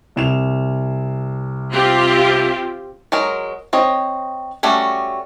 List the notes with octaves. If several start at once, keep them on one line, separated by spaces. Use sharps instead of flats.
C2 E7 F7
C4 F4 G4
F#3 G#3 A#4
C4 C#5 D#5
G3 A3 C#4 F#4